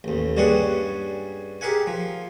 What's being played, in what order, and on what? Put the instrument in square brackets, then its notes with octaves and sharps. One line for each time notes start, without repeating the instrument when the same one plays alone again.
[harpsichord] A1 D#2
G2 G3 C#4 D4 G#4 F#5
G4 G#4 A#4 E5 F#5 G#5
F3